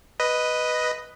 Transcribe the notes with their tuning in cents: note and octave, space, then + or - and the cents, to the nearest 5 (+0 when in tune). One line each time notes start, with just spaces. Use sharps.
B4 +0 D#5 +0